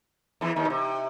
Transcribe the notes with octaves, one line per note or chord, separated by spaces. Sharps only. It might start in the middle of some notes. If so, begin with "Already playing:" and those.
E2 E3
D#2 D#3
B2
C3